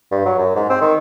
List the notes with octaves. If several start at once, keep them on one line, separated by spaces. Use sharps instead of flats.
G2
F#3
F#2
G#2
C4
D#3